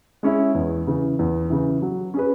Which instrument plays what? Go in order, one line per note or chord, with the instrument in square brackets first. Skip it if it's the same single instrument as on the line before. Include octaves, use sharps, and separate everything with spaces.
[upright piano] G#3 C#4 E4
E2
C#3 E3
E2
C#3 E3
F#3
C#4 G#4 B4